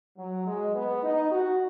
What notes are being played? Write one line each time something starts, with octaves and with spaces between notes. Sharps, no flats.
F#3
G#3
B3
D#4
F#4